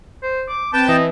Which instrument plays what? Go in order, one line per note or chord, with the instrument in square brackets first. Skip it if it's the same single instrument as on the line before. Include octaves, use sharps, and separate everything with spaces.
[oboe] C5
D6
[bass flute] C4 [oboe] B4 [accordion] G5 A5
[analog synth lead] E3 [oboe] D#5